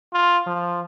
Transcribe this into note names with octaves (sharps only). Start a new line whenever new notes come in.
F4
F3